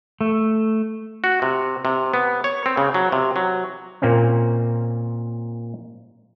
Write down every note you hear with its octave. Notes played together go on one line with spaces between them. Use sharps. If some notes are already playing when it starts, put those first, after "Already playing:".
A3
F#4
C3
C3
B3
C#5
C4
C#3
F#3
C3
F#3
A#2 A#3 C4 C#4